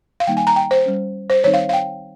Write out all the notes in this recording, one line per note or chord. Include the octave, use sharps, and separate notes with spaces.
F5
D#3 G3 A#3 D#4 G5
G#5
A#5
G5
C5
G3 C#4
C5
D#3 G3 C4 D#4 C#5
F5
F5
G5